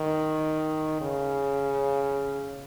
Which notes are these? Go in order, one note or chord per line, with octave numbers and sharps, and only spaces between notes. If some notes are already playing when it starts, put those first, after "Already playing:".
Already playing: D#3
C#3